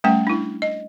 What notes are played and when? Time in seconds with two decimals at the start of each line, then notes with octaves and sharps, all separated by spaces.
0.04 G3 A3 C#4 G5
0.27 D4 E4
0.62 D#5